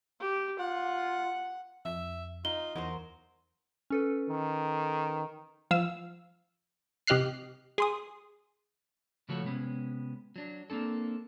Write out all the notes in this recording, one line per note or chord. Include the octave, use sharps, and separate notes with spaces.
G4
F4 F#5
F2 E5
D#4 F4 G7
E2 F#3 D#4 A#4 C5
C#4 A4 B4
D#3
F3 F5 E6
C3 G4 D#5 F6 F#6 C7
G#4 C6 D#6
C#3 F3 A3 F#4 A4 C#5
C3 G#3 B3 C#4
F#3 D4
A#3 C4 D4 A4